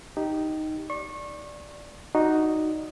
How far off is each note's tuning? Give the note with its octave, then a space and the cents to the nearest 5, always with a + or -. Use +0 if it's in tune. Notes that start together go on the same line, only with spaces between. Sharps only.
D#4 +0 G4 -10
D5 +0 C#6 -30
D#4 +0 F#4 +0 D5 +0